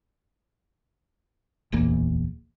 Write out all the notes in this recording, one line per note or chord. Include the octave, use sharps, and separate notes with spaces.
D1 A#1 E2 A#3